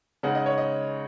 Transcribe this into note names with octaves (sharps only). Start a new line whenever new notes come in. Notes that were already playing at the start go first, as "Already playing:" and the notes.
C#3 G#3 D#4 F#5
D#5
C#5
D#5